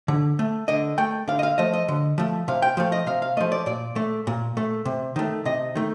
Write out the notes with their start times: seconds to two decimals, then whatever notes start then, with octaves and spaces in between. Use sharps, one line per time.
0.08 D3
0.39 A3
0.68 D3 D#5
0.98 A3 G5
1.28 D3 F5
1.39 D#5
1.43 F5
1.58 F3 A3 D#5
1.73 D#5
1.88 D3
2.18 F3 A3
2.48 C3 F5
2.62 G5
2.77 F3 A3 F5
2.92 D#5
3.06 C3 F5
3.22 F5
3.37 F3 A3 D#5
3.52 D5
3.66 A#2 D5
3.96 A3
4.27 A#2
4.57 A3
4.85 C3
5.16 D#3 A3
5.45 C3 D#5
5.75 D#3 A3